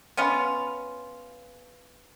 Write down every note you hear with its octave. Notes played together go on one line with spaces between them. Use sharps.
B3 C#4 F4